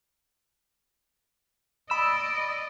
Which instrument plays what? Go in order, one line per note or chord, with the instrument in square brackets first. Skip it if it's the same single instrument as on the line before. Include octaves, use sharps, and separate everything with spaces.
[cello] D5 D#5 [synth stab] B5 E6